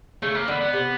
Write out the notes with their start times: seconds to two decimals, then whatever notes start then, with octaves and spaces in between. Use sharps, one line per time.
0.22 C#3 A3
0.35 A#3
0.48 D3 B3
0.61 B3
0.73 C3